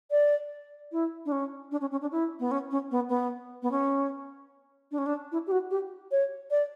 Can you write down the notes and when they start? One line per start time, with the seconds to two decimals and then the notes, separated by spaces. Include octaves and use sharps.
0.11 D5
0.92 E4
1.26 D4
1.32 C#4
1.72 D4
1.81 C#4
1.91 C#4
2.02 D4
2.12 E4
2.40 B3
2.51 C#4
2.71 C#4
2.91 B3
3.09 B3
3.62 B3
3.71 C#4
4.91 D4
4.98 C#4
5.06 D4
5.32 E4
5.47 G4
5.52 F#4
5.71 G4
6.11 C#5
6.51 D5